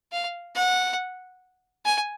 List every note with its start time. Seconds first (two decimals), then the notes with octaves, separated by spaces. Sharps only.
0.12 F5
0.55 F#5
1.86 G#5